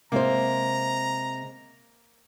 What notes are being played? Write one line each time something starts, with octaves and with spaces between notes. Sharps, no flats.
C3 G#3 A#3 C5 A#5